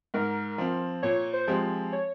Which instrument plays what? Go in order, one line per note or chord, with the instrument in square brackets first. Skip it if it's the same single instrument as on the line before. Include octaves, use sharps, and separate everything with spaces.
[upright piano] G#2 [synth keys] A#4
[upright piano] F3 C4
[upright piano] A#2 [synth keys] C#5
[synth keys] C5
[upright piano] F3 G#3 C4 G4
[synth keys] C#5